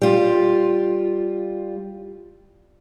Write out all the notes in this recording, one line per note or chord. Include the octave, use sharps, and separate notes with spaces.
G3 F4